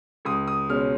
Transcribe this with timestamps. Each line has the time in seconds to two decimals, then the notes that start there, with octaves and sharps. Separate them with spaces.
0.25 C#2 D#6
0.47 D#6
0.69 B2 G#3 C#4 F6